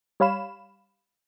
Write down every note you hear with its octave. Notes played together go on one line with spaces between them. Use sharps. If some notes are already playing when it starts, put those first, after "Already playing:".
G3 C#5 F5 B5 E7